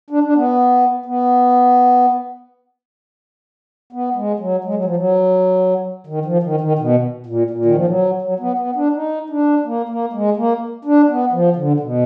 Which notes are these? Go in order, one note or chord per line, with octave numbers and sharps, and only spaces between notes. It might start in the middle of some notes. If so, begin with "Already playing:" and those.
D4
D4
B3
B3
B3
G#3
F#3
G#3
F#3
F3
F#3
D#3
F3
D#3
D#3
B2
A#2
A#2
D#3
F3
F#3
F#3
B3
B3
D4
D#4
D4
A#3
A#3
G#3
A#3
D4
B3
F3
D3
B2